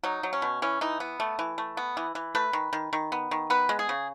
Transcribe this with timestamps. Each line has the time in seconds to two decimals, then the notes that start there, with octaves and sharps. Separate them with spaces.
0.04 F#3 D#4
0.23 F#3
0.33 C#4
0.42 B2
0.62 E3 C#4
0.81 E3 D#4
1.00 B3
1.20 A3
1.39 E3
1.58 A3
1.77 B3
1.97 E3
2.15 E3
2.35 A3 B4
2.53 D#3
2.73 D#3
2.93 D#3
3.12 B3
3.31 D#3
3.50 B3 B4
3.69 G#3
3.79 G#4
3.89 C#3